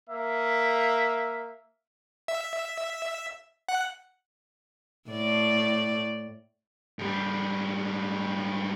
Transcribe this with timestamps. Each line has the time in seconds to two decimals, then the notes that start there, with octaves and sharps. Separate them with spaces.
0.10 A#3 E5
2.28 E5
3.69 F#5
5.10 A2 D5
6.99 G#2 G3